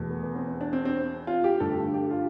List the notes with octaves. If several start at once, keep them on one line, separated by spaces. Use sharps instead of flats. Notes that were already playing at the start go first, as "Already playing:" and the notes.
Already playing: E2 B2 A3
B3
B3
C4
C4
D4
C4
C4
F4
G4
G2 D3 A3 A4
A4
G4
F4